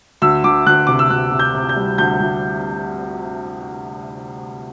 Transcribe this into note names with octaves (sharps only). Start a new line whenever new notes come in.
D2 E6
D2 D6
D2 F#6
C3 D6
E6
D2 F#6
C3
G6
C3
G6
G3
D2 G6
D2